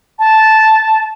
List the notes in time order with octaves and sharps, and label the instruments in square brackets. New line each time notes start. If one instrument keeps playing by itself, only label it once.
[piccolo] A5